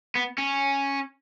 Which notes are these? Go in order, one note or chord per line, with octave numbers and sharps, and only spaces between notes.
B3
C#4